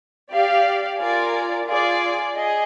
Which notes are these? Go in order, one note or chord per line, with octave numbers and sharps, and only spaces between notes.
G4 D5 F5
F4 A#4 D5 G#5
F4 G#4 D5
G#4 D#5